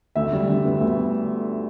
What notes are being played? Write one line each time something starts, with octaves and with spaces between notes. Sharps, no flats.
D2 E5
G3
D3
B3
D2